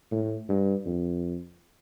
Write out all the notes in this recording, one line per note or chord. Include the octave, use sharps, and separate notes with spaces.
A2
G2
F2